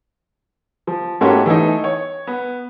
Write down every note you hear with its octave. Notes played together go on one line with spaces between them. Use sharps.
F3
G#2 A3 A#3 C#4 F#4 G4
E3 A3 D#4
C#5
B3